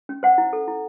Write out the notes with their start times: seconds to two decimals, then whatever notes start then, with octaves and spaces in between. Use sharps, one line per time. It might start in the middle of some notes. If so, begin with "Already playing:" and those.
0.09 C#4
0.23 C5 F#5
0.38 E4
0.53 A4
0.68 E4